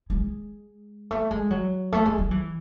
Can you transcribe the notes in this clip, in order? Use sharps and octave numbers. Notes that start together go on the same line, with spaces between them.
G#3
A3
G#3
F#3
A3
G#3
F#3
E3